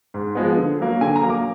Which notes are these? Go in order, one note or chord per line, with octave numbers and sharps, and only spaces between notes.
G#2
F3 G#3 B3
D3
F#3 A#3
D3 G#5
A#5
F#3 A#3
D6